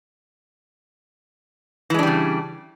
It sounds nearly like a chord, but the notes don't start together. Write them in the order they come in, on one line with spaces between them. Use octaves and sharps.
E3 G#3 D4 G3 C#3